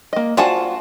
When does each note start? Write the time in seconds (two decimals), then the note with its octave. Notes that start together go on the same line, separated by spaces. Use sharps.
0.13 A#3 D#5
0.37 F4 F#4 C5 D5 G#5 A5